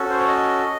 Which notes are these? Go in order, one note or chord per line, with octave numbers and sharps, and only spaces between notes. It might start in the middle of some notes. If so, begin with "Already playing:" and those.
Already playing: C#4 F#4 A4
C5
C#5
D#5